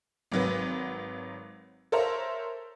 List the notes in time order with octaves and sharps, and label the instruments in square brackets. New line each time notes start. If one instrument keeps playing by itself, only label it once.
[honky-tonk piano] G#1 F#3 B4
A4 A#4 C5 C#5 E5 A#5